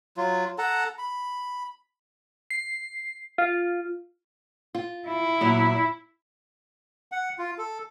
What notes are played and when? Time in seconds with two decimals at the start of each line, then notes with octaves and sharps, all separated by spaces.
0.17 F#3 F4
0.58 A4 F#5 A5 A#5
0.98 B5
2.50 C7
3.38 F4
4.75 F4
5.08 E4
5.41 A#2 F#3 B3
7.12 F#5
7.39 F4
7.58 A4